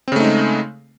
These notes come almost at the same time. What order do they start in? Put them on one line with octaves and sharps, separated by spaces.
C4 C#3 A3 D#4 G#3